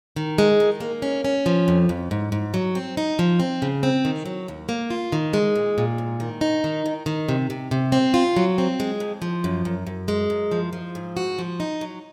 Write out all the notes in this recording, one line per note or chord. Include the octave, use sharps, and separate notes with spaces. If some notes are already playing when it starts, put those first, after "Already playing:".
D#3
G#3
D#3
A#3
C#4
C#4
F3
F2
F2
G#2
G#2
F#3
C4
D#4
F3
C4
C#3
C4
D#3
F#3
D#2
A#3
F4
D#3
G#3
A#2
A#2
G#2
D#3
D#4
D#3
D#3
D#3
C3
C3
C3
C4
F4
F#3
C4
G#3
F2
F3
F#2
F#2
F#2
G#3
F#2
F3
F3
G#2
F#4
F3
D#4
F#3